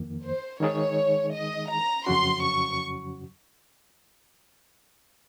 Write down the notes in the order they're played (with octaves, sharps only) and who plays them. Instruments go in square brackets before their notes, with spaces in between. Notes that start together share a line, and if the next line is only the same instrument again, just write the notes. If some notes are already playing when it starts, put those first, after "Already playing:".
Already playing: [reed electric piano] F2 D#3 A#3
[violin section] C5
[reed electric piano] D#3 G#3 D#4 G#4 [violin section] C#5
[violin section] D#5
A#5
[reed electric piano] F2 C#3 F#3 C#4 F#4 [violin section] C6
[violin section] C#6